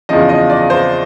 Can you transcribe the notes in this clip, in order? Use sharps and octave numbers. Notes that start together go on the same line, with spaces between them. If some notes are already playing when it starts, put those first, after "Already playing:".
E2 C#3 F3 D#5
D#5
D5
C5